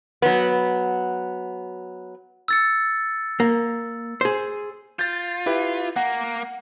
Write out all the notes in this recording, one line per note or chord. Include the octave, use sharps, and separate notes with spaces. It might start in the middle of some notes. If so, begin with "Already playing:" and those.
F#3 B3
E6 A6 C#7
A#3
G#4 C5
F4 G6 A6
E4 G4 B4
A#3 F#5